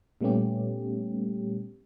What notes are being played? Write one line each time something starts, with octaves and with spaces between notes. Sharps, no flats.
A#2 G3 A3 B3 C#4 G4